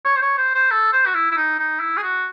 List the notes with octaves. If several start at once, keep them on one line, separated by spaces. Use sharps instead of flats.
C#5
C5
C#5
C5
C5
A4
C5
F#4
E4
E4
D#4
D#4
E4
G#4
F#4